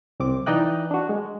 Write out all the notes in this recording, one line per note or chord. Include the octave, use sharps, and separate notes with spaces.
C2 C4 D6
E3 D#4 D5 D#5 G5 F#6
D4 F#4
G#3